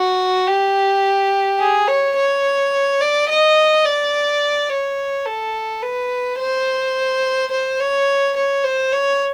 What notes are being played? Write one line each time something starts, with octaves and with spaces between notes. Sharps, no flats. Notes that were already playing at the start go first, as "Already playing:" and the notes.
Already playing: F#4
G4
G#4
C#5
C#5
D5
D#5
D5
C#5
A4
B4
C5
C5
C#5
C#5
C5
C#5